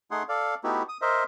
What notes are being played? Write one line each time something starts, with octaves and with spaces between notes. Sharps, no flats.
A3 D#4 G#4 F#5 C6
A4 D5 F5
A3 B3 D#4 E4 F#4 G4
D#6
A#4 C5 D#5 E5